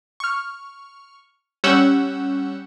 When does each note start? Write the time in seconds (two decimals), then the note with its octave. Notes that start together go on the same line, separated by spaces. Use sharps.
0.20 C#6 F6
1.64 G3 C#4 F#5 C#6 E6 G6